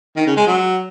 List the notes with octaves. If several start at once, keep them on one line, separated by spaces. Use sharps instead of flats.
D#3
C#3
G#3
F#3